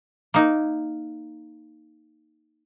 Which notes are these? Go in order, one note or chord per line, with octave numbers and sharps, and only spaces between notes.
A#3 D#4